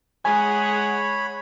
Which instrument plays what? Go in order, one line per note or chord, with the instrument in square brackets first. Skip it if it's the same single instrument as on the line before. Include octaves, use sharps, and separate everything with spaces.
[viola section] G#3 G#4 F#5 [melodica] C#5 B5 [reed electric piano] G#5